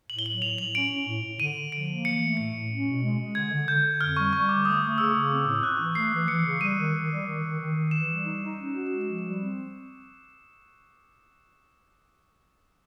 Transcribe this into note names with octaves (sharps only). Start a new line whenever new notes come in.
A2 F#7
G7
F#3 F#7
A2 F7
A2 F#7
C#4 D7
C#4
A2
A2
D3 D#7
D3
F3 D7
A#3
E3 C#7
A3
A2 C#7
A2
C#4
B2
G#3
G#3
D3 G#6
D3
D3 G6
D3
F2 F6
G3 C#6
G3 C#6
D3 D6
A3 D#6
A3
C#3 E6
C#3
C4
A2
C4 F#6
E3
A3 C7
E3
E3 C#7
C#3
G3 D#7
D#3
D#3
G3
D#3
D#3
D#3
D#3
E3 E7
G3
D#4
D#4
C#4
F#4
G#3
F3
G3
C4